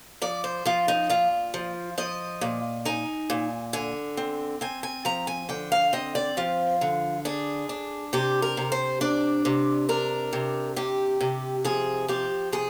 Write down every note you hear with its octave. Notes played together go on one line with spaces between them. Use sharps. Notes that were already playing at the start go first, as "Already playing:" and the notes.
F3 D5
C5
F3 F4
D#4
A#2 F4
F3
F3 D#5
A#2
D#4 G#5
A#2
D3 G#5
C4
C4 G#5
G#5
F3 A#5
G#5
D3 G5
F5
C4 D#5
D5
F3 F4
D3
D4 G#4
D4
C3 G4
A#4
C3
C5
D4 D5
C3
D4 A#4
C3
C3 G4
C3
F3 G#4
F3 G4
C3 G#4